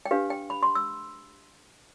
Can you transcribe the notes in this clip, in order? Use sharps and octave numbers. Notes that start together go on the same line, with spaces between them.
G5
D4 G4 B4 F5
G5
B5
C6
E6